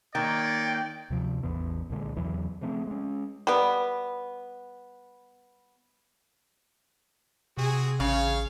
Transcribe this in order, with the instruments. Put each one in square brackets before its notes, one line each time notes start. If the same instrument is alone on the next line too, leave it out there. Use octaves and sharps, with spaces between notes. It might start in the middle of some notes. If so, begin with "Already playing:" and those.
[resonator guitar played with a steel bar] D#3 [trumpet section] A#3 C#5 D5 [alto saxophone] G5
[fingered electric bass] D2 C3 F3
A1 E2 E3 B3
C2 A#2 D3 G#3
E2 C#3 E3 F#3
C#3 F3 A3 C4
G#3 C#4
[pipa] G3 B3
[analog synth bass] C3 [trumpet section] C4 F#4 G#4
[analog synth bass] A1 [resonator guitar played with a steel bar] C#3 [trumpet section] G#4 C#5 F5